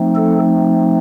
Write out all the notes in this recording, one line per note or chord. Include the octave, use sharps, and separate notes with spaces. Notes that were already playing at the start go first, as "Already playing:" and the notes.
Already playing: F3 A3 C4 D#4
A4